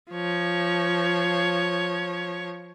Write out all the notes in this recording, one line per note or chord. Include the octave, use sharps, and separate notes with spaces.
F3 C#5